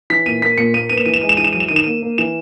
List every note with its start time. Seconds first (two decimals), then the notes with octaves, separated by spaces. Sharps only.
0.10 E3 B6
0.26 A#2 D#7
0.42 A#3 B6
0.58 A#2 C#7
0.74 A#3 D#7
0.89 B3 D#7
0.97 E7
1.06 E3 D#7
1.14 E7
1.21 G#3 D#7
1.29 E7
1.37 E3 D#7
1.44 E7
1.53 F#3 D#7
1.60 E7
1.68 D#3 D#7
1.76 E7
1.84 A#3 D#7
2.02 A#3
2.18 E3 E7